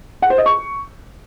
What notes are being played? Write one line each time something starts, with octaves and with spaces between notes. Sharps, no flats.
F#5
C5
D#5
C#6